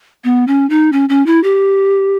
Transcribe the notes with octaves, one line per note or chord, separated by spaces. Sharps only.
B3
C#4
D#4
C#4
C#4
E4
G4